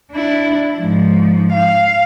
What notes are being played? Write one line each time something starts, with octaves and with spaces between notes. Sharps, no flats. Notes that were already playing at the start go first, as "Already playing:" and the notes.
D4 E4
G#2 F3
F5